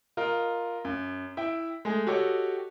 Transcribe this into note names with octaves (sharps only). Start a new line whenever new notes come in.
F4 A#4 D#5
F#2
E4 E5 G5
G#3 A3 G#4
F#4 G4 A4 C#5 D#5